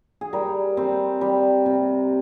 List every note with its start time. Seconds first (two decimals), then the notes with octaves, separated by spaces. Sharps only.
0.21 G#4
0.33 G3 A#4
0.77 G3 C4
1.21 G3
1.66 C3